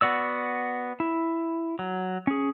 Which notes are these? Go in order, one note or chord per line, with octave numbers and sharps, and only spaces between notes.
B3 F#4 D5 E6
E4
F#3
C#4 G#4